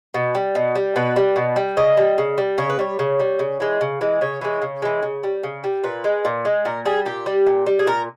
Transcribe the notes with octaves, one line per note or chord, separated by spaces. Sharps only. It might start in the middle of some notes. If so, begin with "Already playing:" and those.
B2
G3
B2
G3
B2 B4
G3
B2
G3
C#3 D#5
G3
C#3
G3
C#3 C#5
B4
G3 C#5
C#3
G3
C#3
E3 G#3
C#3
E3 G#3
C#3 C#5
E3 G#3
C#3
E3 G#3
C#3
G3
C#3
G3
A#2 B4
G#3
A#2
G#3
A#2 A#4
G3 G#4
A#2 G4
G3
A#2
G3
G#4
A#2 A#4